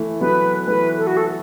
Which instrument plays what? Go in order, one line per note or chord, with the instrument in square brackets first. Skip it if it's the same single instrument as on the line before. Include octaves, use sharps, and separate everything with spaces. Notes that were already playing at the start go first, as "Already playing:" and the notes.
Already playing: [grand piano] E3 A3
[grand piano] F#3 B3 [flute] B4
[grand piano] E3 A3 [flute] B4
[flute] A4
F#4
A4